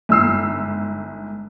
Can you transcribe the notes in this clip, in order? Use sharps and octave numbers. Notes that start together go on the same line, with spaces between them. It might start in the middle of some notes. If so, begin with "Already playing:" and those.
G1 G#2 E6 C7